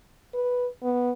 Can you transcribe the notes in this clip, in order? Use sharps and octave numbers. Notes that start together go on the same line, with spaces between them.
B4
B3